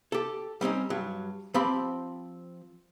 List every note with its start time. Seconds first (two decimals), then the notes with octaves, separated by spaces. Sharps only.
0.12 G4 A4
0.61 G3 C4 C#4 D#4
0.90 G2 F#3
1.54 F3 C4 G4 B5